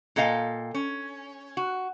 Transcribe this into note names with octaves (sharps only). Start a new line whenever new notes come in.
A#2 A4 D#5 F5 G5
C#4
F#4